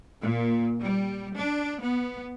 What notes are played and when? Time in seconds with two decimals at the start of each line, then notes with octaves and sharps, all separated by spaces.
0.21 A#2
0.79 G3
1.34 D4
1.79 B3